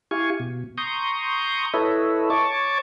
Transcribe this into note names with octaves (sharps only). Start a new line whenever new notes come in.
E4 G4 F5 G#5 C#6
B2
A#5 C6 C#6 D#6 G6
E4 A4 B4 C#5 D#5 E5
C#5 A5 C#6 D6